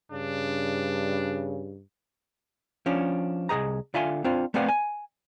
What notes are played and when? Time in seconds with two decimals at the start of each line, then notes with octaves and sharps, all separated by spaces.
0.12 G2 C#3 D4
2.86 F3 C#4 D4
3.49 C2 F#3 G#4 D#5 A#5
3.94 D3 F4 E5 F5 G#5 C6
4.24 C4 D4 F4 C5
4.54 A3 B3 C4 D5 F5 F#5
4.68 G#5